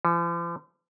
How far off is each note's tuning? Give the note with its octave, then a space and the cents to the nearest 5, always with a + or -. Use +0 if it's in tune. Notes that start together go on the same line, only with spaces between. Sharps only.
F3 -45